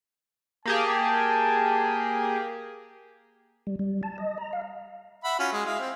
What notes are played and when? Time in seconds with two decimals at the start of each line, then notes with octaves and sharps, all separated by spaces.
0.66 A#3 G4 G#4 A5
3.67 G3
3.79 G3
4.03 A5
4.18 D#5
4.38 A#5
4.53 F5
5.24 E5 F#5 B5
5.39 C#4 F4 F#4
5.53 G#3
5.65 G#3 E4 F5
5.79 C4